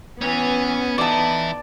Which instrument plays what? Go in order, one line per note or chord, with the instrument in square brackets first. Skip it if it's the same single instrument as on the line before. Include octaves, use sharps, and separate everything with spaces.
[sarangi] E3 [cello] B3 [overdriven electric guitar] C#4
[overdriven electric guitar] E3 E4 [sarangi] D#4 [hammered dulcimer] D5 A5